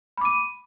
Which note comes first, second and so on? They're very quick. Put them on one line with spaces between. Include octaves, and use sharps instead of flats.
B5 D6 D#7